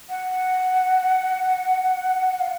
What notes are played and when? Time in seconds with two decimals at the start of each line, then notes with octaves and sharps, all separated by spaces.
0.10 F#5
2.40 F5